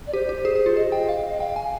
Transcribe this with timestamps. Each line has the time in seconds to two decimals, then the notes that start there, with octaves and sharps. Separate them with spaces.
0.07 D5
0.13 G4 C5
0.29 G4
0.45 G#4
0.55 G#4
0.66 F4
0.76 G#4 D#5
0.92 G5
1.09 F5
1.29 D#5
1.40 F5 G5
1.56 G#5